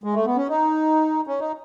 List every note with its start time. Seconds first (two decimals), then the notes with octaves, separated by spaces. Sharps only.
0.04 G#3
0.14 A3
0.26 B3
0.36 C#4
0.48 D#4
1.27 C#4
1.40 D#4